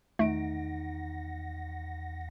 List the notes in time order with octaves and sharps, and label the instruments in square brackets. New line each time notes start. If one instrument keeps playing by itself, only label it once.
[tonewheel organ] E2 F#5 A#6 [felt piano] D#3 D7 [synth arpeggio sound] A3